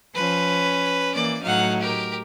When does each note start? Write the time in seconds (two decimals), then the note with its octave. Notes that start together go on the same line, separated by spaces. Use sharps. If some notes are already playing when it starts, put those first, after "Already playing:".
0.15 F3 C#4 B4
1.14 E3 A#3 D5
1.43 A2 F#3 D#4 F5 F#5
1.81 G4 A#4